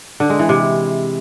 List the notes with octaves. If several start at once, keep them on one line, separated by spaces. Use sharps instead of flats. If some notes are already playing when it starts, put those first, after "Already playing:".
D3
G#3
E3
C3